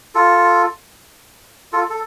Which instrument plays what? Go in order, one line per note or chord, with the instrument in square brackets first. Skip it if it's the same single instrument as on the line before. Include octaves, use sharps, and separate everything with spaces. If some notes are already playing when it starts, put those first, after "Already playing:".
[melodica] F4 A4
F4 A4
A4